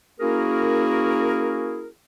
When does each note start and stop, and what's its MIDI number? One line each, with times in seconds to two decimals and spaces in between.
0.20 1.87 58
0.20 1.87 61
0.20 1.87 64
0.20 1.87 66
0.20 1.87 68
0.20 1.87 70